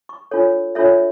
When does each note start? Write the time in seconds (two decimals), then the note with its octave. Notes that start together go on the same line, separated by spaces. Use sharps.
0.09 C#6
0.31 D4 F4 A4 C#5
0.75 D4 F4 A4 C#5 E5